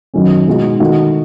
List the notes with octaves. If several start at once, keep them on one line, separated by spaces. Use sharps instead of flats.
F#2 D#3 F#3 A3 C#4
B2 G#3 D#4 F#4
D#3 A3 D#4 F#4